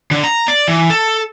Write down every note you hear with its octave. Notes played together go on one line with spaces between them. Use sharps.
D3
A#5
D5
E3
A4